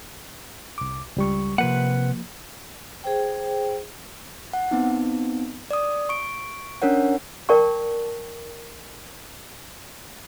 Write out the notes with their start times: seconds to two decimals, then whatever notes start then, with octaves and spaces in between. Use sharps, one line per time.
0.78 C2 D6
1.17 C#2 G3 C#6
1.58 C3 F3 A#3 B4 F#5
3.04 G#4 C5 G5
4.53 F#5
4.71 B3 C4 D#4
5.71 D5 D#6
6.09 C#6 D7
6.82 C#4 D4 A#4 C#5 F#5
7.49 A#4 D5 G5 A5 C#6